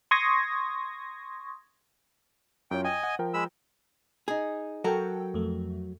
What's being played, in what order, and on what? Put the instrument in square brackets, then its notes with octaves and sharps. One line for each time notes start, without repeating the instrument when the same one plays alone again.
[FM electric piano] C6 C#6 D#6 G#6 A#6
[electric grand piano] F#2 F4 C#5 [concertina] G5
[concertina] D#5 G#5 [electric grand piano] G5
[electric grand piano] F#5
F3 A#4 G5
[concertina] G#3 B5 E6
[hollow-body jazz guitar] D#4 G#4
[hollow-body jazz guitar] F#3 F#4 A#4 [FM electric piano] A4 G5
[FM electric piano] F2 A3